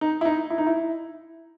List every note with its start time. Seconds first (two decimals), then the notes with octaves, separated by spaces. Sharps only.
0.01 D#4
0.21 E4
0.25 D#4
0.50 E4
0.58 D#4
0.67 E4